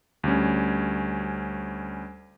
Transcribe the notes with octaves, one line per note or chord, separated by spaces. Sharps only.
D2 G3 C#4